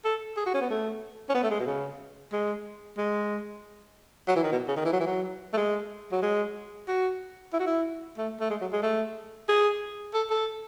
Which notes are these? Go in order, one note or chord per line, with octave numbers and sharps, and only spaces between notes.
A4
G#4
F#4
C#4
B3
A3
C#4
B3
A3
G#3
B2
C#3
G#3
G#3
F#3
E3
D#3
B2
C#3
D#3
E3
F#3
E3
F#3
A3
G#3
F#3
G#3
F#4
E4
F#4
E4
A3
A3
G#3
F#3
G#3
A3
G#4
A4
A4